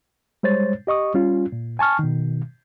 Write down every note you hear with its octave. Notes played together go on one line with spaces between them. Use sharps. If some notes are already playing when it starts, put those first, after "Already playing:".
G3 G#3 C5 C#5 A6
G4 D#5 C#6 D#6
G3 C#4 F4
A#2
G#5 A5 C#6 F6
B2 D#3